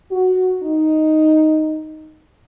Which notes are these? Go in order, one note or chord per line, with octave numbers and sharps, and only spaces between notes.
F#4
D#4